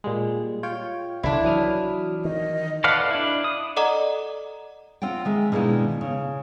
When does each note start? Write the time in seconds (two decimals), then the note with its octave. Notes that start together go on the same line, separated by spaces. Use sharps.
0.04 A#2 G3 G#3
0.63 F4 C#5 G5
1.23 C2 D3 D#3 D4 E4
1.44 E3 F#3 D#6 F6
2.25 D#3 D#5
2.84 A4 B4 D5 F5 F#5
3.10 D4 E4
3.44 D#6
3.76 A4 D5 D#5 F#5 A#5 D6
5.02 C4 F4 F#5 G5
5.25 D#3 G#3 E5
5.52 B2 D#3 G#3 A#3 D4 E4
6.01 C#3